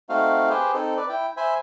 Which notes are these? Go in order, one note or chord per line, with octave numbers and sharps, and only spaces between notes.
A3 C4 D#4 F#4 F5
G4 G#4 B4 C5
C4 D#4 A4
B4 D5
E4 G5
C5 E5 G#5 B5